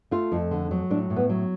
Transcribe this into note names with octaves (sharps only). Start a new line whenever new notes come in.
A3 F4
F2
D3
F#3
A2 D4
A2
B3
F#3